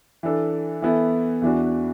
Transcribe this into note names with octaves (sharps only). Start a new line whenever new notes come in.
E3 D4 A4
E3 B3 E4 A4
E2 E3 D4 F#4